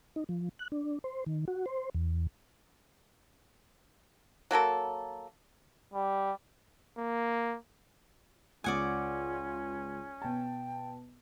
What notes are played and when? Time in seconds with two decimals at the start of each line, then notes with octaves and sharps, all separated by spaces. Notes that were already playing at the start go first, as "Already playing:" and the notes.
0.16 D#4
0.29 F3
0.59 F#6
0.72 D4
1.04 C5
1.26 D#3
1.48 F#4
1.66 C5
1.95 E2
4.51 F#3 A#3 A4 A#4
5.94 G3
6.98 A#3
8.64 C#2 C#4 F4 D5 F#5 G#5 D#6
10.22 B2 G5 A5